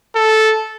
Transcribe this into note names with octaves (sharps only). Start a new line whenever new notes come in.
A4